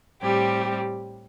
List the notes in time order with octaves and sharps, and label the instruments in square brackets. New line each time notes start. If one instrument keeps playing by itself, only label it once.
[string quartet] A2 G3 C4 G4